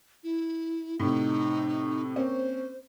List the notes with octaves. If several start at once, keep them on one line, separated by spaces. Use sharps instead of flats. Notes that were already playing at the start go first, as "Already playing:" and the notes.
E4
A2 C3 D#4
A#3 C4 C#4 C5